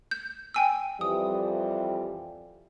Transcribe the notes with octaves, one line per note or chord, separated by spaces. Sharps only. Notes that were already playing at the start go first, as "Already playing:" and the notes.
G6
G5 G#5 E6
F2 E3 G3 D#6